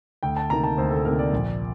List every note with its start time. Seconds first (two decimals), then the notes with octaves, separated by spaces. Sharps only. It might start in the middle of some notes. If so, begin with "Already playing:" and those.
0.23 D2 G5
0.37 A5
0.50 C3 D#3 A#3 A#5
0.64 A5
0.78 D2 C5
0.91 A4
1.05 C3 D#3 A#3 A#4
1.19 D5
1.33 A#1